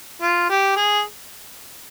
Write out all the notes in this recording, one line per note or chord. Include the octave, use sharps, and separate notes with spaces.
F4
G4
G#4